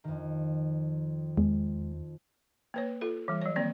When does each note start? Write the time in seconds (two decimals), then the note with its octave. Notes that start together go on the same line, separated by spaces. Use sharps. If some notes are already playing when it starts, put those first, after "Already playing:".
0.04 F2 D#3
1.37 E2 G#3
2.74 A#3 B4 C#5
3.01 F4 A4
3.28 E3 G3
3.42 F#3 C#5
3.56 D#3 A#3 C4 D5